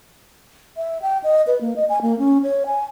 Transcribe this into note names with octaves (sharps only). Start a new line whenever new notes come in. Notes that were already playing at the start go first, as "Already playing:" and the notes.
E5
G5
D#5
B4
A#3
D#5
G#5
A#3
C#4
C#5
G#5